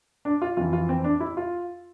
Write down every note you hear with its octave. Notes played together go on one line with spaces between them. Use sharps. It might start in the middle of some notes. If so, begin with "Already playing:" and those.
D4
F4
F2 E3 F4
F4
C4
D4
E4
F4